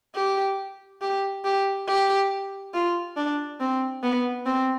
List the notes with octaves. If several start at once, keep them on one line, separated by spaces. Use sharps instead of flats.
G4
G4
G4
G4
F4
D4
C4
B3
C4